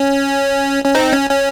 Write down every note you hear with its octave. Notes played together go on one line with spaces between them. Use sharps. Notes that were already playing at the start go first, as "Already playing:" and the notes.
Already playing: C#4
C#4
C4 D#4
C#4
C#4